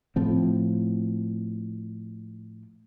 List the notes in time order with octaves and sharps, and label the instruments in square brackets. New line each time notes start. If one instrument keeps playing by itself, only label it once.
[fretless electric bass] A2 F3 C4